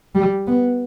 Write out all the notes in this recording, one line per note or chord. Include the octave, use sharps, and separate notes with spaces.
G3
B3